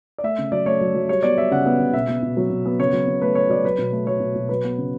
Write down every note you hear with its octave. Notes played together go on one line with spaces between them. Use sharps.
D5
A3 E5
C#3
F#3 D5
A3 C#5
F#3
F#3
G3 C#5
B3 D5
G3 E5
C#3 F#5
B3
C#3
B2 E5
B3
B2
F#3
B2
B3
C#3 C#5
F#3
C#3
A3 B4
A3 C#5
F#3 D5
F#3 B4
B2
A3
F#3 C#5
B2
B2
F#3 B4
B3
C#3